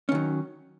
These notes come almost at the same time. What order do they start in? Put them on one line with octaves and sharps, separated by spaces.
C#4 D#3 F#3